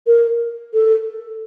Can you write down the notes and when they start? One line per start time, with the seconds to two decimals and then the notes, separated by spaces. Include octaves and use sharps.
0.07 A#4
0.74 A4